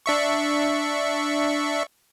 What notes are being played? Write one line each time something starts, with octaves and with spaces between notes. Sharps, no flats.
D4 E5 C#6